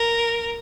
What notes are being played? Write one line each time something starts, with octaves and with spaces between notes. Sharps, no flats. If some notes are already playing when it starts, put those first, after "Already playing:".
Already playing: A#4